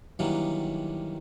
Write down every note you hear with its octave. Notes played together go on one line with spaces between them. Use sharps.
D#3 E3 F#3 G3 A#3 D4